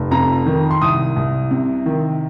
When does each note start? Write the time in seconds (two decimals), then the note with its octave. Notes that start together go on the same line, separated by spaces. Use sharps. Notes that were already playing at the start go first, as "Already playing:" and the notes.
Already playing: F1
0.11 F2 A#5
0.46 D#3
0.71 C6
0.81 C2 D#6
1.16 C2
1.51 C3
1.86 D#3